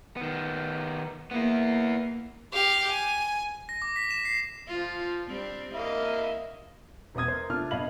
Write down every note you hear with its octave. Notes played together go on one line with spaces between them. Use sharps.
D#3 B3
A#3 B3 E4
G4 F5
G#5
A#6
D6
B6
E7
C7
F3 F4
G3 C4 D4
A#3 E4 D#5 F5
E1 B3 C4 D#6 G#6
A#4 C5
C3 A3 D4 F4 F6
G2 B3 D#5 F5 B5 F#7